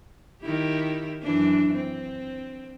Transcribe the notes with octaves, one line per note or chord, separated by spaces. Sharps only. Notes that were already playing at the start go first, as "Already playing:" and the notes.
D#3 E4 G4
F#2 E3 D4
C4